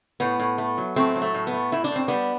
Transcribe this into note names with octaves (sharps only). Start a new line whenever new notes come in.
A2 B3
A2
A3
F#3
A2 A3 C4
F#3
A3
A2
B3
A3
A2 E4
D4
A2 C4
G3 B3 D4